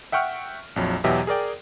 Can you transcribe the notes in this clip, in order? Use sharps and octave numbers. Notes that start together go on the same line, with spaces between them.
E5 F#5 G5 C#6 F6
A#1 F2 F#3
E2 B2 F#3 G4 D#5 E5
G#4 A#4 D5 G5